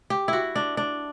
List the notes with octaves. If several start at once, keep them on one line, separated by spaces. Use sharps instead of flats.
G4
E4 F#4
D4
D4